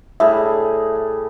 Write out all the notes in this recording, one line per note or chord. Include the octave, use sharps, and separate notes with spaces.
A2 G3 G#4 E5